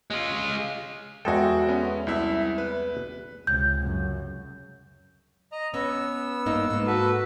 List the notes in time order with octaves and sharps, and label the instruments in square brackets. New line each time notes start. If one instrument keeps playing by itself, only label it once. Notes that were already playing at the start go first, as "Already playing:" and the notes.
[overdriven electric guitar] G#3 F4
[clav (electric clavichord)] E2 G#3 A4 [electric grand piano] F#4 G5
[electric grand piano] B3 C#4
C2 E4 E5
B4
[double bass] C#2 C3 [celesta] G6
[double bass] C#2 F#2
[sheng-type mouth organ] D#5 A#5
[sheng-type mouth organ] B3 E6 [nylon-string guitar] C#4
[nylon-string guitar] G2 A#3 D#4
G#2 A#3
[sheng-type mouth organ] F#4 A4 B4